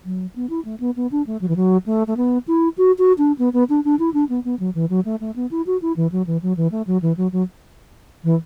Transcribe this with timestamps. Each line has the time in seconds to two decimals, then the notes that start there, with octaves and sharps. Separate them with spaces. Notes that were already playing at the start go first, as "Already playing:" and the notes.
0.05 F#3
0.36 B3
0.50 E4
0.65 A3
0.80 B3
0.96 B3
1.12 D4
1.27 A3
1.41 F#3
1.48 E3
1.56 F#3
1.86 A3
2.07 A3
2.17 B3
2.48 E4
2.78 F#4
2.98 F#4
3.18 D4
3.39 B3
3.53 B3
3.69 D4
3.85 D4
3.99 E4
4.14 D4
4.29 B3
4.45 B3
4.59 F#3
4.75 E3
4.90 F#3
5.05 A3
5.21 A3
5.36 B3
5.51 E4
5.67 F#4
5.82 E4
5.96 E3
6.12 F#3
6.27 E3
6.43 F#3
6.57 E3
6.72 A3
6.87 F#3
7.02 E3
7.17 F#3
7.32 F#3
8.24 E3